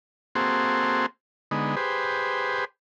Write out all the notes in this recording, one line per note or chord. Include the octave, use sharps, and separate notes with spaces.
A#3 C4 F#4 G#4 A4 C5
D3 G#3 B3 D#4
G4 G#4 B4 C5